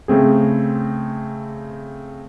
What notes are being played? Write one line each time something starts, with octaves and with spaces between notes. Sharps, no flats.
C#3 A3 C4 G#4